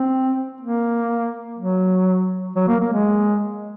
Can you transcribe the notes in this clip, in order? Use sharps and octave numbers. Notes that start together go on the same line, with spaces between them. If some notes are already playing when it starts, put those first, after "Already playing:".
Already playing: C4
A#3
F#3
F#3
A#3
A#3
G#3